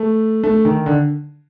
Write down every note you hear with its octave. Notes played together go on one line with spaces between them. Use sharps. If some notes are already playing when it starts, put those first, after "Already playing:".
Already playing: A3
A3
D#3
D3